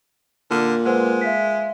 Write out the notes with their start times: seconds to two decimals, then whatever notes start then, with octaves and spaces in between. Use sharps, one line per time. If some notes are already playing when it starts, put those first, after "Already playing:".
0.51 A#2 D3 F6
0.85 G#3 B4 C5 F#5
1.21 E5 F5 B6